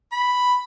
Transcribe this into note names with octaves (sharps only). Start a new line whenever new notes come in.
B5